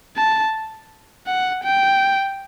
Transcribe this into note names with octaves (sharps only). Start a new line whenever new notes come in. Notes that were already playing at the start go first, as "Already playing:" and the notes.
A5
F#5
G5